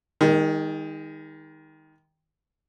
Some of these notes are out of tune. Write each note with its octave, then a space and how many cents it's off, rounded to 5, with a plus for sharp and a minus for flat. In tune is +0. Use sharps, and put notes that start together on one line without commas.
D#3 +15 G#3 -30